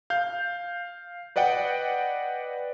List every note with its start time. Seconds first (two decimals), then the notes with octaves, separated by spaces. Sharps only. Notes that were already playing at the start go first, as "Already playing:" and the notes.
0.10 F5 G6
1.36 B4 D5 D#5 F#5 G5